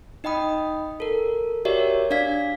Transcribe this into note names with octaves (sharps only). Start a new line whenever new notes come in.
D#4 D#5 G5 B5 D#6
A4 A#4
F#4 G4 A#4 C#5 D5 E5
D4 D5 F5 G#6 B6